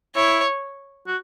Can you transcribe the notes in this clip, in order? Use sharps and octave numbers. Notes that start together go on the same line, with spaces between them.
E4 C#5
F#4